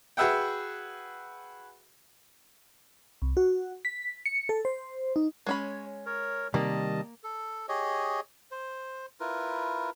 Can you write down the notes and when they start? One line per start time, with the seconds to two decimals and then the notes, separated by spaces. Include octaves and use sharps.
0.17 F#4 G#4 B4 E5 F#5 G5
3.22 C2
3.37 F#4
3.85 B6
4.26 C#7
4.49 A4
4.65 C5
5.16 D#4
5.46 G#3 C#4 C#5 B5
6.06 A#4 C#5
6.54 C3 D#3 G3 A#3 D#5 A5
7.23 A4
7.69 G4 G#4 C#5 D#5
8.51 C5
9.20 E4 F4 A#4 B4